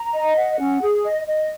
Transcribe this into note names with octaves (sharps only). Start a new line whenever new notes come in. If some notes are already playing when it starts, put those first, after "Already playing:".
Already playing: A#5
D#5
F#5
C#4
G#4
D#5
D#5